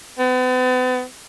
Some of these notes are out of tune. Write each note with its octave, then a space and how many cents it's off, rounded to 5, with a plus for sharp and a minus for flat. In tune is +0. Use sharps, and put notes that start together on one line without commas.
B3 +40